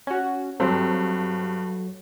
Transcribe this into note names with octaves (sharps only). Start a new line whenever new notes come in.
C#4 F#4
G2 F#3 C4 A4